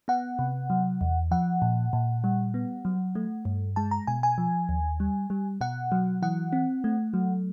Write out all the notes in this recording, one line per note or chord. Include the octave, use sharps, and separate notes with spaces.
B3 F#5
C3
F#3
E2
F3 F#5
A#2
A#2
G3
B3
F#3
A3
G2
G#3 A5
A#5
B2 G#5
G#5
F3
D#2
G3
G3
B2 F#5
F#3
E3 F#5
C4
A3
F#3